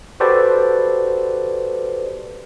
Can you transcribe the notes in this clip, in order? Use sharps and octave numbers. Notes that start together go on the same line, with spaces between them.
F#4 G4 A4 B4 C5 D5